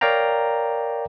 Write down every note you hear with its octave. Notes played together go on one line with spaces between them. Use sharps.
A#4 C#5 D5 F5 G5 A#5